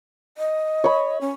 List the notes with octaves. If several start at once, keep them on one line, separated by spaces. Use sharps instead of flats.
D#5
C#5 B5
C#4